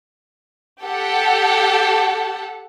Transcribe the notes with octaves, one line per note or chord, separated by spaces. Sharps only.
G4 A4 F#5 A5